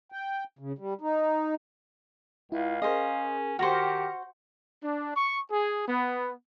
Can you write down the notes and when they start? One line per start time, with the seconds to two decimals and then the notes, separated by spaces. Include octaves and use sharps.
0.12 G5
0.59 C#3
0.78 G3
1.01 D#4
2.52 C#2 E4 F5
2.82 C#4 G#4 A#4 C5 D#5
3.59 D#3 F#4 G4 C5 F6 A#6 C#7
4.83 D4
5.15 C#6
5.51 G#4
5.87 B3